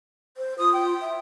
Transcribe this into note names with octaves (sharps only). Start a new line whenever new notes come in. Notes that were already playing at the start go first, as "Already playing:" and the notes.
C5
F4 D#6
G5
E5